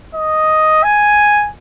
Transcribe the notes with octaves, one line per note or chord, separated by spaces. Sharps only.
D#5
G#5